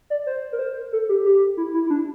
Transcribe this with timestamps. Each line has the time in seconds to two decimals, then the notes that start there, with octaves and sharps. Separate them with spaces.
0.10 D5
0.26 C5
0.52 A#4
0.59 C5
0.93 A4
1.09 G4
1.25 G4
1.57 E4
1.74 E4
1.86 E4
1.90 D4